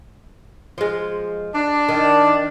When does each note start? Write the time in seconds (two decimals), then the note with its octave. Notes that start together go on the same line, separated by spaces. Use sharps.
0.78 F3 G#3
1.55 D4
1.89 D#3